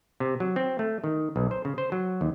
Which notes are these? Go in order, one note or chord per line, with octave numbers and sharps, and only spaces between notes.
C3
F#3
C4
A3
D#3
B1
C5
C#3
C5
F#3
D#2